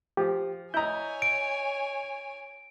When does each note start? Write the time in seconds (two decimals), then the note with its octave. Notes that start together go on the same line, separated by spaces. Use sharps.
0.17 F3 G4
0.74 E4 C#5 D#5 G#5 A#5 G6
1.22 D7